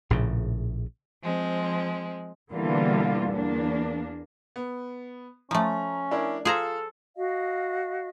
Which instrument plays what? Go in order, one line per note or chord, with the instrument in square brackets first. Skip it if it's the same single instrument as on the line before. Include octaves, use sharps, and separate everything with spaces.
[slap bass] A#1 A2 C#3
[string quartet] F3 G#3 C4
[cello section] B2 D3 E3 G3 A#3 F4
E2 A#3 D4
[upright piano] B3
[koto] F3 A3 [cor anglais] C#4 [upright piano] A#5
[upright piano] D4 E4 A#4
[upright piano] F4 [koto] G#4 C5 A#5 [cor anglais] A4
[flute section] F#4 D#5 F5